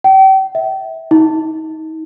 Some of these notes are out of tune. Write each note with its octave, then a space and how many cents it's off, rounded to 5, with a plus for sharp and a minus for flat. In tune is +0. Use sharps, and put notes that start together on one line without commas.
G5 -35
E5 -20
D#4 +30